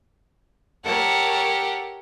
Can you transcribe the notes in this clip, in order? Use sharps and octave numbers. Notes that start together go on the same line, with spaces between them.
G4 A4 A#4 C#5 F#5